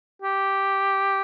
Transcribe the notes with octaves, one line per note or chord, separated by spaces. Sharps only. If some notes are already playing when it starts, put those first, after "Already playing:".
G4